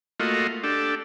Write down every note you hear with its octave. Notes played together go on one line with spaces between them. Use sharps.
A3 A#3 F4 F#4 D#5
D4 G4 A4